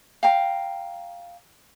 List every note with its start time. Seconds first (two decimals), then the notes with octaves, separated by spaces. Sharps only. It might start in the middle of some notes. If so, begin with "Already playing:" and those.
0.23 F5 G5 A#5